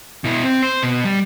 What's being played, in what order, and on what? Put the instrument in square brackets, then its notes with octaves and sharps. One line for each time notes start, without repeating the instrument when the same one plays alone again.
[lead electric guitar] B2 E4
C4
C5
B2
G3